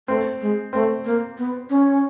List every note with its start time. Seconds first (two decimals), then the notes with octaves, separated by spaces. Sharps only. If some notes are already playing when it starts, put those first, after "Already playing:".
0.08 A3 C4
0.41 G#3
0.73 A3 C4
1.05 A#3
1.38 B3
1.70 C#4